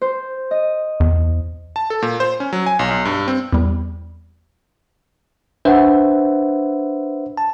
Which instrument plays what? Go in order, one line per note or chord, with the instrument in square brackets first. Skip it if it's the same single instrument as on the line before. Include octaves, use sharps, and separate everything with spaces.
[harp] C5
D#5
[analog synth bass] E2
[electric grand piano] A5
A4
A#2
C5
C#4
F#3
G#5
B1
B1
G2
C4
[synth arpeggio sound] E2 G3
[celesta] D4 F#5 [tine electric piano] B4 C5 E5
[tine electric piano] A5